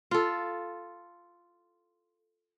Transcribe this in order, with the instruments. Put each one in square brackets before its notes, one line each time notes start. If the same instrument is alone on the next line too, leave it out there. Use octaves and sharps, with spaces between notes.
[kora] F4 A4